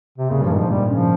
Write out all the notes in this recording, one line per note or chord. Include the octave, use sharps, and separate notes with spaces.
C3
A#2 C#3
G2 F3
G#2 D#3
F3
A#2 G3
C#3 F3